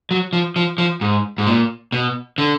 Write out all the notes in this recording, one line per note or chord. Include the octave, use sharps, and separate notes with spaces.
F#3
F3
F3
F3
G#2
G#2
A#2
B2
D3